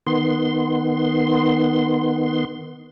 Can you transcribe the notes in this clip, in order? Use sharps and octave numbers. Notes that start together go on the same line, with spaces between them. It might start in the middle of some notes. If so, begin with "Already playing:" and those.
D#3 B3 C6